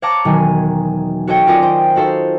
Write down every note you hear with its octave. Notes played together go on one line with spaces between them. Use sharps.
C#5 F5 F#5 A5 A#5 D6
E1 D#3 F#3 D#4 G#5
F#4 A4 C#5 D#5 G5
C#4 F4 A#4 D5 D#5 F#5
C5 G5 D#6
D#4 F#4 A4 C5 F5